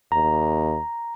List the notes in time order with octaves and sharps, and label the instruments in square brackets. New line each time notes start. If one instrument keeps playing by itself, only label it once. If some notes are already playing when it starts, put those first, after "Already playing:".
[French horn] D#2 [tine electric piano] A#5